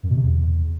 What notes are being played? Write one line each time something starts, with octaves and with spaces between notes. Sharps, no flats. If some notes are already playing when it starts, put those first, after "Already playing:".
F#2
B2
C3
E2